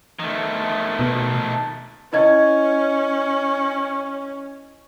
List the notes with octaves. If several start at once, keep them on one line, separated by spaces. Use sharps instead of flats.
D#3 A3
B2
C#4 E4 D#5 G#6